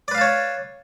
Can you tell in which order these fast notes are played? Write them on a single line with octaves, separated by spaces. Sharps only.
D5 B4 F5 A5 C#5